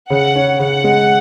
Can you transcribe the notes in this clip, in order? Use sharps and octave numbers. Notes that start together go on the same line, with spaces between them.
C#3 F#5
C#4
C#3 F#5
G#3